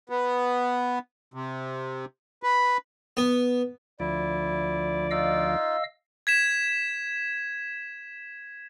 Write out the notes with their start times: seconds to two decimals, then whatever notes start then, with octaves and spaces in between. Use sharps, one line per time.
0.10 B3
1.34 C3
2.43 B4
3.17 B3
4.00 D2 F3 E4 D5
5.11 D#4 F4 D#5 F5 E6
6.27 G#6 B6 E7